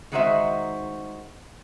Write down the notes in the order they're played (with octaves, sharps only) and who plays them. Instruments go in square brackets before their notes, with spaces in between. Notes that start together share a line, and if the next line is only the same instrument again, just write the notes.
[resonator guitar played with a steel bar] D#3 G#3 D#4 F#4 C5 E5